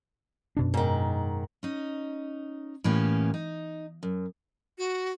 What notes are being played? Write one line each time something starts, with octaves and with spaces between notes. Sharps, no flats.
F#2 B2 D4
G#2 D#3
C#4 D#4
A2 E3 A#3 B3 C#4 G4
D#4
F#2
F#4